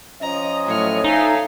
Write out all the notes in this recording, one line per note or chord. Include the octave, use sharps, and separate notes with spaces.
F3 C#4 D#5 A#5
A2 F#3 C#5 F6
A3 D#4 A4 C#5 F5 G#5